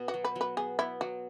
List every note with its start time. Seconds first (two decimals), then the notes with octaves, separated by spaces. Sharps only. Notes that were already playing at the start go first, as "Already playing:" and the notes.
Already playing: B2 B3
0.08 F#4
0.14 F#3
0.24 B4
0.36 F#3
0.41 B4
0.57 B3 G#4
0.79 B3 E4
1.01 F#3 F#4